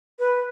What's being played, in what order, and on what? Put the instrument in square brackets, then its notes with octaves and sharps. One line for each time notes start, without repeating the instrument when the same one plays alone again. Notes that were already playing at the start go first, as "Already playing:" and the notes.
[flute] B4